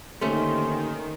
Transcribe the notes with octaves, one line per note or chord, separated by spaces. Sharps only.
D3 D#3 A3 A#3 C#4 G4 C5